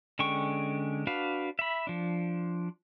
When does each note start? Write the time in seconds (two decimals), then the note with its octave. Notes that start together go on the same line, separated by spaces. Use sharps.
0.19 D3 G#3 C#4 G5 C#6
1.07 D4 F#4 B4 F5
1.59 E5 B5
1.87 F3 D4